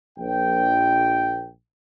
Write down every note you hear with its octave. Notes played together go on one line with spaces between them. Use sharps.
A#1 G5